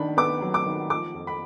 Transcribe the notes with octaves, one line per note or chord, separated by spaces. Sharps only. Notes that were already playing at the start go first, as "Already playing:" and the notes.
Already playing: D#3 D4 B5
B3 D6
F#3
D6
D#3
F3 D6
F2
B5